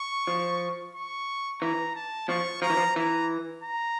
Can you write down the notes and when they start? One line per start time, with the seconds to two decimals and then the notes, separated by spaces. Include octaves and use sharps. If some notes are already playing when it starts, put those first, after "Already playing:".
Already playing: C#6
0.27 F3
0.95 C#6
1.61 E3 A#5
1.95 A5
2.28 F3 C#6
2.62 F3 A#5
2.70 E3
2.77 F3
2.96 E3 A#5
3.63 A#5